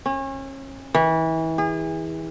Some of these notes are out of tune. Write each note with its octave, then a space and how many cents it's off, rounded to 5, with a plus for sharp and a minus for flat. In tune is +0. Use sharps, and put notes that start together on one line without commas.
C#4 -35
E3 -30
G#4 -35